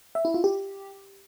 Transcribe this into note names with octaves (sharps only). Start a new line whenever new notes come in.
E5
E4
F4
G4